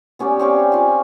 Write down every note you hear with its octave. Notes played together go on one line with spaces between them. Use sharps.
B3 C#4 G4 D5
C4 C#4 G4 F5
F4 G#5